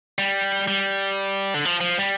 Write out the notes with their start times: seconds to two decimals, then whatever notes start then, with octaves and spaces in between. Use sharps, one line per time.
0.19 G3
0.68 G3
1.54 D3
1.65 F3
1.81 F3
1.98 G3